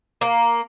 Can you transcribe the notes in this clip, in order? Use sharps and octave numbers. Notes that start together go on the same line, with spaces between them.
A#3